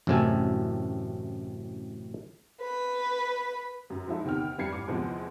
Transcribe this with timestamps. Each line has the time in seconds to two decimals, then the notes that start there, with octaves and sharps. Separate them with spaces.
0.07 A1 F#2 A2 C3 A4 G#5
2.61 B4
3.90 F#2
4.08 F3 G#3 D#4 E4 A4
4.25 E2 C3 D#3 G5 F6
4.58 F2 E3 G3 G#6 C7 C#7
4.73 A1 D6
4.88 E2 C3 E3 F3 G#3